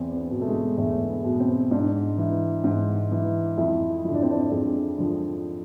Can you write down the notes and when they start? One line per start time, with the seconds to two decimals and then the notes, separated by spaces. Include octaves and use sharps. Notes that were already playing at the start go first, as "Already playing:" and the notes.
Already playing: E2 C4
0.16 B3
0.31 B2
0.41 A3
0.47 G#3
0.78 E2 A3
1.09 B3
1.24 B2
1.40 C4
1.71 G#2 D4
2.18 E3
2.64 G#2
3.12 E3
3.58 F2 E4
4.04 D3 F3 E4
4.14 D4
4.22 C4
4.31 D4
4.51 F2 G#4
4.98 D3 F3